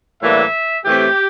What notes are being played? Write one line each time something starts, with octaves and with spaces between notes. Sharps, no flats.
A2 E3 G3 A#3 D4 E5
A2 E3 A3 C4 G4